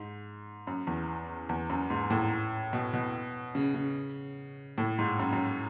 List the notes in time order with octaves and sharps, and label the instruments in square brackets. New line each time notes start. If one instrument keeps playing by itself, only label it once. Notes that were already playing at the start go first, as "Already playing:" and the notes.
Already playing: [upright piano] G#2
F#2
E2
E2
F#2
G#2
A2
B2
B2
C#3
C#3
A2
G#2
F#2
F#2